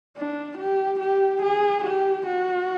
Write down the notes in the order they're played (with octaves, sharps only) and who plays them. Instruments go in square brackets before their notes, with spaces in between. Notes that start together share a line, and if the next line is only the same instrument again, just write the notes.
[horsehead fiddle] D4
G4
G4
G#4
G4
F#4